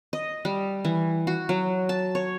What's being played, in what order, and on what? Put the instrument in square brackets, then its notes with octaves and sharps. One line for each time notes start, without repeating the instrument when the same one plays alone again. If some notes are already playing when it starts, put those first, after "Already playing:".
[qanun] D#5
G3
E3
F#4
F#3
A5
C#5